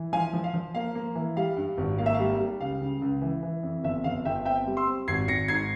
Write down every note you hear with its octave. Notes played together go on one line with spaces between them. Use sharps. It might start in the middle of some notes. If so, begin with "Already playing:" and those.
Already playing: E3
F3 F5 G#5
F3
F5
F3
A#3 F5
A#3
E3
G3 F5
G2
G#1
A#3 F5
E5
G3 F5
G3
C#2 F5
C#3
C#2
E3
E3
F2
G1 E5
G1 F5
G1 E5 G5
C4 E5 G5
G3
C6 E6
C4
G#1 G#6 C7
G#1 A#6 C#7
G#2 G#6 C7